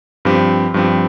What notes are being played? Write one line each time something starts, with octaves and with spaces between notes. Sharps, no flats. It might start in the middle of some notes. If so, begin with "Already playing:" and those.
G2 F3 C4 G4
G2 F3 C4 G4